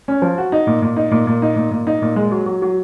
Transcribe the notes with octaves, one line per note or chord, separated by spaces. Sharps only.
C#4
F3
F#4
D#4
A#2
A#2
D#4
A#2
A#2
D#4
A#2
A#2
D#4
A#2
G#3
F#3
F#3
F#3